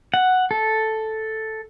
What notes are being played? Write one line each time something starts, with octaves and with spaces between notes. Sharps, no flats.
F#5
A4